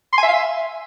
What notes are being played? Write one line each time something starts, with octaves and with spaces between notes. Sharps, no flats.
C6
G#5
E5
F5
E5